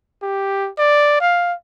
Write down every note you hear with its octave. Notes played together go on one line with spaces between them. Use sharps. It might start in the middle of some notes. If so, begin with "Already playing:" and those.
G4
D5
F5